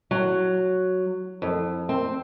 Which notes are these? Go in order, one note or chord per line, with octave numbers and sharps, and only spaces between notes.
F#3
F2
C4